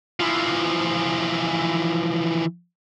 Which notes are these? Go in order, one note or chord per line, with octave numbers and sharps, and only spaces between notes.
E3 F3